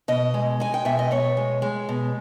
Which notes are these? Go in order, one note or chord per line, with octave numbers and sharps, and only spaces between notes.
B2 D#5
G#3
G#3 G#5
G5
B2 E5
D#5
B2 C#5
G#3
G#3
B2